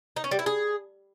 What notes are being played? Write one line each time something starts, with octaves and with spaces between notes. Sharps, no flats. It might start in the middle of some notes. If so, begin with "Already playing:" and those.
D#4
C#4
G3
E4
G#4